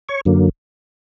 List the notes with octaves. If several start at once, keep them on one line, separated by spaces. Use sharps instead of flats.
C#5 C#6
F#2 D3 F#3 A#3